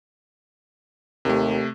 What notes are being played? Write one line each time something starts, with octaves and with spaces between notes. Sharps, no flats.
D#2 C3 A3